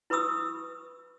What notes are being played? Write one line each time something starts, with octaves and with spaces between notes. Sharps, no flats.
E4 B4 B5 C#6 D#6 E6